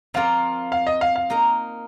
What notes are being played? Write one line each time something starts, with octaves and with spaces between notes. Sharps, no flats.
F3 C4 F4 A#4 D5 F5
F5
D#5
F5
F5
A#3 D#4 A#4